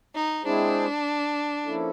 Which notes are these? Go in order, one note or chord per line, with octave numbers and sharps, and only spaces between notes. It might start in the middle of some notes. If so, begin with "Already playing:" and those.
D#4
G#3 C4 D4 E4 G#4 C5
F3 A#3 C#4 E4 A4